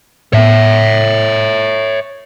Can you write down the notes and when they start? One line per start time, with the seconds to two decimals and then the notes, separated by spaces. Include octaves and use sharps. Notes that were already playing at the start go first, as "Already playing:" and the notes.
0.33 A2 B3 C#5 E5